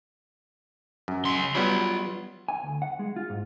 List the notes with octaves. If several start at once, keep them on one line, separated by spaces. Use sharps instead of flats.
F#2
C#2 C6
F#3 G3 B3 F4 B5
G#5
D2
F#5
G#3
F4
G#2